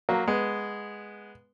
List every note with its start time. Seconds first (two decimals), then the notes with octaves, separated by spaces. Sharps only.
0.09 F#3 A#3
0.28 G#3 B3